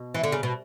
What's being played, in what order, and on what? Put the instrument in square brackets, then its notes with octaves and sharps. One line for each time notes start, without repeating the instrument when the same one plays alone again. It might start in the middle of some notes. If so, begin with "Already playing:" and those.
Already playing: [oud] B2
E3
D3
C#3
B2